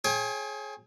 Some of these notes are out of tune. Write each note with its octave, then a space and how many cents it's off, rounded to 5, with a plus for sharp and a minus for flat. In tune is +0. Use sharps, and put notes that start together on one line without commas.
G#4 +25 C#5 -30 G5 +35